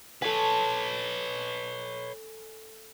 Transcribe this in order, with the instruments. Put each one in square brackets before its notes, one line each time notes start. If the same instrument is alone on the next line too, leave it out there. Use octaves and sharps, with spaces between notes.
[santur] A4 G#5 [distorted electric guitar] B4 C#5